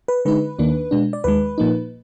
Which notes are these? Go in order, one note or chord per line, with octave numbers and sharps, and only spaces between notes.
B4
D3 G#3 D#4 B4
D#2 D#3 A#3 D4
B2 G#3 D4
D5
D#2 D#3 G#3 B4
A#2 F3 A#3 D#4